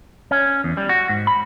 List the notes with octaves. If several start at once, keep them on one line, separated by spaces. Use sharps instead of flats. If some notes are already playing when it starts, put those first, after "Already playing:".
C#4
E2
G3
F#4
G#2
B5